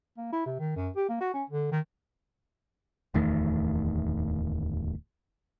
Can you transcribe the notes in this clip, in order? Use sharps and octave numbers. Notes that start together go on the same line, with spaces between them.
A#3
E4
C3
D#3
F#2
G4
A#3
F#4
C#4
D3
D#3
D1 E2 D#3 A3